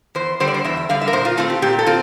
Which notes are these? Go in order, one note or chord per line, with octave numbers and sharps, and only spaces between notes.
E2 C5
D3 G3 C5
D5
C5
E2 E5
E5
D3 G3 F5
E5
A#4
A#2 C5
F4
A3 C4 F4
G4
A#2 G4
A4
C4 F4